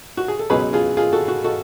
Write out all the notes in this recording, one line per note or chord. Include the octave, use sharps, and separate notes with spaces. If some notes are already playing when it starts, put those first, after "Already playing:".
F#4
G#4
A4
C#2 B2 F#3 C#4 G#4 B4
F4 G#4
F4 G#4
F#4 A4
F#4
F#4 A4